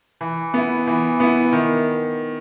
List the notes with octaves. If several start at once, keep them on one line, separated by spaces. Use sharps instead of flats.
E3
B3 E4
E3
B3 E4
D#3